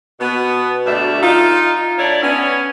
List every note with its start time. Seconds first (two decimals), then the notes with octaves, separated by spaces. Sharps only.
0.19 B2 B3
0.86 D2 B2 G3 A3 E5
1.23 D#4 F4
1.98 A2 D4 E4 C#5 D5
2.23 B3 C#4